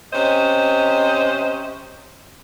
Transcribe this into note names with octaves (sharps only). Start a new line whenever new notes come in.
C3 C#4 C5 D#5